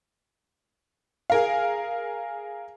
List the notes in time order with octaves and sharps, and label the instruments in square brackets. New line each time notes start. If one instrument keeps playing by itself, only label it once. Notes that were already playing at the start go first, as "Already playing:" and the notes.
[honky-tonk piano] G#4 A#4 F5